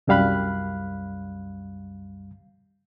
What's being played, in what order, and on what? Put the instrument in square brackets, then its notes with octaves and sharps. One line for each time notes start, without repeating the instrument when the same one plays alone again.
[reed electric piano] C2 F#2 G3 F5 B5 F#6